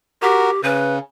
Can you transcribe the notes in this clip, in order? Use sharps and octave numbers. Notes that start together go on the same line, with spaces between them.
F#4 G4 A#4
C#3 B4